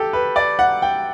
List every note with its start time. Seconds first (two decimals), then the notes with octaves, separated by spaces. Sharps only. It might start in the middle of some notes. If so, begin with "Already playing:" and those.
Already playing: G4 A4
0.13 B4
0.36 D5
0.59 F#5
0.82 G5